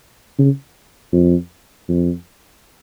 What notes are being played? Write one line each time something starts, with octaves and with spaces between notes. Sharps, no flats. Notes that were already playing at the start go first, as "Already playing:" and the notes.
C#3
F2
F2